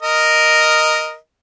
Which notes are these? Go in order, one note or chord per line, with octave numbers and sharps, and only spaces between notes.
A#4 D#5